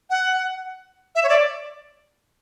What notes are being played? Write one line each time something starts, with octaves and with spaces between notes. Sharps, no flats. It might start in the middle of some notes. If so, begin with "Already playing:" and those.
F#5
E5
C#5
D5